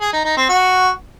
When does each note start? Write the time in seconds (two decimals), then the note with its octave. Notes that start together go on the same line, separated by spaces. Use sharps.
0.01 G#4
0.13 D#4
0.25 D#4
0.37 C4
0.49 F#4